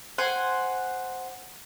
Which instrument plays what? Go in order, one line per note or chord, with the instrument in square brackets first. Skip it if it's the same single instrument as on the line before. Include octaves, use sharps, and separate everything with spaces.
[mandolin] C5 F#5 G#5